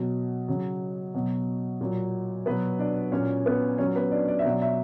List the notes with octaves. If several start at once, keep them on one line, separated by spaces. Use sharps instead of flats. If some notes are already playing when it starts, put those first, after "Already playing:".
Already playing: B2 F#3
C#3 F#3
B2 F#3
A#2 F#3
B2 F#3 B3 B4
D4 D5
A#2 F#3 C#4 C#5
B3 B4
A#2 F#3 C#4 C#5
B3 B4
D4 D5
D5
E5
B2 F#3
D5
E5